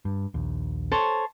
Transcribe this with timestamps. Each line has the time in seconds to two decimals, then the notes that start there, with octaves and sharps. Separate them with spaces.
0.05 G2
0.34 A#1 D#2
0.92 A4 C5 C#5